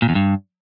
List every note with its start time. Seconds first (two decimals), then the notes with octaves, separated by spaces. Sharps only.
0.02 A#2
0.09 E2
0.15 G2